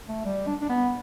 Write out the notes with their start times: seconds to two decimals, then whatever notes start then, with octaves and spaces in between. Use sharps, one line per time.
0.08 A3
0.25 G3
0.47 D4
0.62 D4
0.69 B3